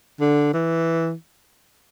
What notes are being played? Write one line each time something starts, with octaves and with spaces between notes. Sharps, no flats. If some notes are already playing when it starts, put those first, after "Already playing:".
D3
E3